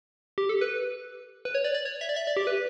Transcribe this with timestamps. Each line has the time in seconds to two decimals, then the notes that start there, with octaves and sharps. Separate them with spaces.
0.38 G4
0.49 A4
0.61 B4
1.45 B4
1.55 C#5
1.64 D5
1.75 D5
1.85 C#5
2.01 E5
2.09 D5
2.16 E5
2.27 D5
2.37 G4
2.47 B4